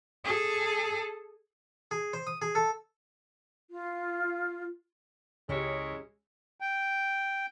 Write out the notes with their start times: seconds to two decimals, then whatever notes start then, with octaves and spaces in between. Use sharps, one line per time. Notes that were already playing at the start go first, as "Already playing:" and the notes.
0.25 G#4 A4
1.91 G#4
2.13 C5
2.27 D#6
2.42 G#4
2.55 A4
3.70 F4
5.49 C#2 G#3 C#4 E4 G4 A#4 C#5
6.60 G5